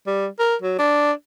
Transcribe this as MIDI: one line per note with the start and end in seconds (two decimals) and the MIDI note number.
0.07 0.27 55
0.39 0.56 70
0.62 0.76 54
0.79 1.12 62